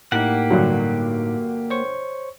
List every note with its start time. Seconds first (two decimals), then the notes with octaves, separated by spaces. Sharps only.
0.12 A2 A#3 D#4 G4 F#5
0.50 G2 D3 F#3
1.70 C5 C#5 C#6